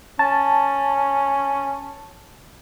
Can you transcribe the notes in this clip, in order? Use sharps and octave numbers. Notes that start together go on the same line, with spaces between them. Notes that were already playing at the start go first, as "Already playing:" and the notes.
C#4 A5